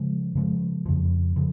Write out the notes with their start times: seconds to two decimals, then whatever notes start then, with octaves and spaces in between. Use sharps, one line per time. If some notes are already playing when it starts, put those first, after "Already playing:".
Already playing: C#3 F3 G#3
0.35 C#3 F3 G#3
0.86 F2 C#3 F3
1.36 C#3 F3